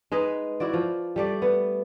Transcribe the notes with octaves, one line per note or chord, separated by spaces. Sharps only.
G#3 D#4 B4 D#5
E4 F#4 D5
F3
G3 A3 D5
B3